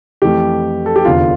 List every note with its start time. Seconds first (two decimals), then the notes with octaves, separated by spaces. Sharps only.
0.22 F2 E3 A3 G4
0.86 A4
0.96 G4
1.05 F1 E2 D3 F4